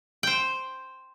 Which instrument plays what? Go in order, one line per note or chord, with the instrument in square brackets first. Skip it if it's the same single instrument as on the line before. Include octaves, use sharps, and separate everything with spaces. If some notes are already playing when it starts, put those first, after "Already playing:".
[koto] C5 G5